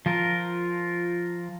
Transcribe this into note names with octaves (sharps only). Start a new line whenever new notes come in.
F3 F4 A#4